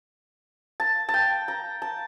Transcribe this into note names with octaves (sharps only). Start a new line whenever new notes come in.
A5
A5
G5
A#5
A5